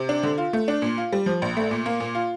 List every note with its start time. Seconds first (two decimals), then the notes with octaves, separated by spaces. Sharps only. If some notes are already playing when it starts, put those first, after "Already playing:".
Already playing: C3
0.09 D4
0.23 D3
0.38 F4
0.53 A3
0.68 D4
0.82 A#2
0.97 F4
1.12 G3
1.26 F3
1.42 A#1
1.57 A3
1.71 A#2
1.86 A#3
2.00 A#2
2.15 F4